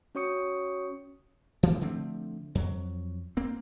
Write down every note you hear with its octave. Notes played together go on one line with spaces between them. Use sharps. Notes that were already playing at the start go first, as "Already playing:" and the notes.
C#4 F#4 C#5 C#6 D#6 C#7
D2 E3
D3 F3 A3 C4
F2 F#3
A#3 C4